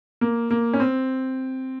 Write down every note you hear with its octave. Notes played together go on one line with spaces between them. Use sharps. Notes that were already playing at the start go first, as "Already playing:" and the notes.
A#3
A#3
C#4
C4